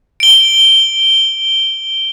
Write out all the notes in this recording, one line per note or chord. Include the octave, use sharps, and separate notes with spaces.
D7 G7